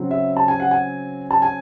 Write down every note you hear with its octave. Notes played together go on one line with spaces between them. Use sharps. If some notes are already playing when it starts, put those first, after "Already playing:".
Already playing: C#3 F#3 C4
E5
A5
G#5
F#5
G#5
A5
G#5